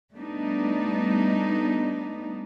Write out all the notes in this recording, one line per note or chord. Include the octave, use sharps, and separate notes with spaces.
G3 A3 B3 D4 D#4